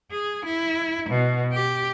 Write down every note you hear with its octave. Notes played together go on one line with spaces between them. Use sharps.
G#4
E4
B2
G4